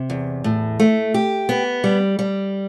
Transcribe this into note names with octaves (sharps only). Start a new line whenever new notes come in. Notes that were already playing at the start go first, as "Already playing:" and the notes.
Already playing: C3
E2
A2
A3
G4
B3
G3
G3